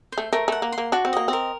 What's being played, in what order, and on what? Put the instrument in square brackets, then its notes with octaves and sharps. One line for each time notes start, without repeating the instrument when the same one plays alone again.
[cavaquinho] C5
[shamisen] A3
[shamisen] A3 [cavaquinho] A#4
[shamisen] A3 [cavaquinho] F#5
[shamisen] A#3
[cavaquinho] C6
[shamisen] A#3
[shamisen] D4 [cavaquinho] F#4
[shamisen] C4
[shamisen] A#3 [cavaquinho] D#5
[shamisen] C4 [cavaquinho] A#4